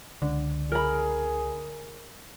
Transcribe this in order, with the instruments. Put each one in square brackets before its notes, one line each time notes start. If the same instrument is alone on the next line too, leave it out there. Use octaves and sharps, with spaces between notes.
[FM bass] C#2 [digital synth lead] D3
[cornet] G#4 [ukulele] A#4 B5